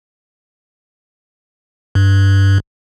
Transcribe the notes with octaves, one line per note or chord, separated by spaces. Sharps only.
G2